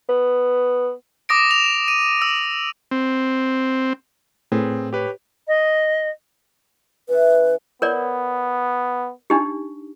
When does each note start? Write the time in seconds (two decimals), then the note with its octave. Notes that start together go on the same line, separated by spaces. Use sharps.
0.09 B3
1.29 D6 D#6 A#6 D7
1.51 F7
1.88 D#7
2.22 E6
2.91 C4
4.52 A2 C4 G#4 B4
4.93 G4 B4 C#5
5.47 D#5
7.09 E3 C#4 B4 E5
7.82 B3 A#4 C#5 D5
9.30 D4 D#4 G4